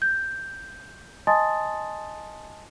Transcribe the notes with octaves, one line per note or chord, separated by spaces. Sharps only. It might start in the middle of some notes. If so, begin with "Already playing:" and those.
G6
D#5 G#5 A5 C6 D#6 A6